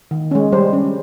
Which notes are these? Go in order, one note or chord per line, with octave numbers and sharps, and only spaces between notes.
D#3
G#3 C#4
G3 C5
C#4